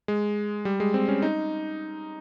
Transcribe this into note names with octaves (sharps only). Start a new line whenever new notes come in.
G#3
G3
G#3
C4
C#4
D#4